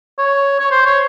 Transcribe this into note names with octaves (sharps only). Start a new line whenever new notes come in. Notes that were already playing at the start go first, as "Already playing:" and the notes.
C#5
C#5
C5
C#5